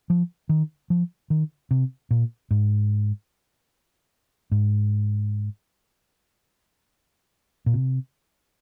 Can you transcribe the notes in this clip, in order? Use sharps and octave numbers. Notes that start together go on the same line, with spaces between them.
F3
D#3
F3
D#3
C3
A#2
G#2
G#2
A#2
C3